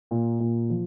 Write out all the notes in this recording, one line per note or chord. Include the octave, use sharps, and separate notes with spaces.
A#2
A#2
F3